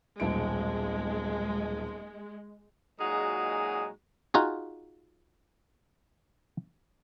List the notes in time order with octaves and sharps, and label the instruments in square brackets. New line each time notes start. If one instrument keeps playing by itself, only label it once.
[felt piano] D#1 B1 D7 [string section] G#3
[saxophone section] A#2 F#3 G#3 D#4 F#4 G#4
[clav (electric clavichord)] D#4 F4 F#4 G#4